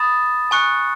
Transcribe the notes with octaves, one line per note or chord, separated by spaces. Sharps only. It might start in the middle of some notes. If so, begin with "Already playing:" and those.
Already playing: B5 D#6 A6 E7
G#5 C#6 F#6 C#7